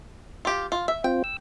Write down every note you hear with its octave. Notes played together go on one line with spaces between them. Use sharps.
F4 G4
F4
E5
C4 F4 G5
E6